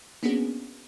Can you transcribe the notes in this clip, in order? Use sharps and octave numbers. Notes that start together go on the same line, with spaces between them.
A#3 B3 C#4 D4 F#4 G#4